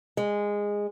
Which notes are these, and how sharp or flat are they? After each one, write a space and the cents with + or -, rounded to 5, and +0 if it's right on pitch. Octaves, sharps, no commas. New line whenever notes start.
G#3 -15